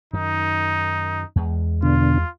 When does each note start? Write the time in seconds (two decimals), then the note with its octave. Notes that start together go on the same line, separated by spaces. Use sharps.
0.13 F#2 D#3 D#4
1.36 E2 G#3
1.83 B2 D3 F4